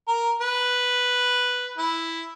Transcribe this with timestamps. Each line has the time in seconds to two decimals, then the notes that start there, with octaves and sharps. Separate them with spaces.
0.08 A#4
0.41 B4
1.77 E4